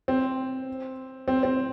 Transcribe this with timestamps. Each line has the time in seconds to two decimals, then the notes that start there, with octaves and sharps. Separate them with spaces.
0.08 C4
1.28 C4
1.43 C4